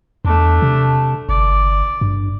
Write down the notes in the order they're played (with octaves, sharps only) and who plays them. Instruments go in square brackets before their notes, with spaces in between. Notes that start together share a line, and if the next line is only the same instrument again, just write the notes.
[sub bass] E2 [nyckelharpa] A3 D4
[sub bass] C3
[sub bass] G1 [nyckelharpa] D5
[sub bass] G2